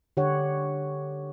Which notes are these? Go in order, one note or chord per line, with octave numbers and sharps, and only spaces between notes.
D3 G4 C#5 F#5